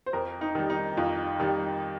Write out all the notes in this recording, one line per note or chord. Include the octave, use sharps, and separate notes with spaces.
C5
F2 A#4
D#4
D#3 G3
D#4
F2 F4
D#3 G3